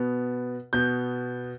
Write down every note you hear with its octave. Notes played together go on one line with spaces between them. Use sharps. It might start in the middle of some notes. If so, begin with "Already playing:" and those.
Already playing: B2 B3
B2 B3 G6